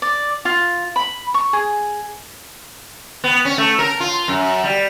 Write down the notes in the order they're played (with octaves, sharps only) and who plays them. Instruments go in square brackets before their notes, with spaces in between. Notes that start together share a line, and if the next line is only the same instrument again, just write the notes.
[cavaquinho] D5
F4
B5
C#6
G#4
[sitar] B3
C#4
A3
A#4
F4
F#2
G3